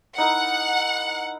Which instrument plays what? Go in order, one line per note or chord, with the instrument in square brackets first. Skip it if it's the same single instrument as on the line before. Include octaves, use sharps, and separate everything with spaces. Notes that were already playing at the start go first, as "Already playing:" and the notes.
[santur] D#4 E4 A#4 [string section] F#5